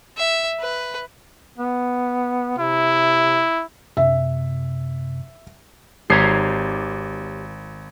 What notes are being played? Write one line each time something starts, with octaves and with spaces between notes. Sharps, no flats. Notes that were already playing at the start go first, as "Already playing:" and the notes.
E5
B4
B3
C3 E4
F#2 C3 E5
G#1 G4 C#5 A#5 C7